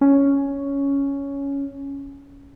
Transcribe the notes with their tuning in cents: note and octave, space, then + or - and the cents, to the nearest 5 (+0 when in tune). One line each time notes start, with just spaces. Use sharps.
C#4 +5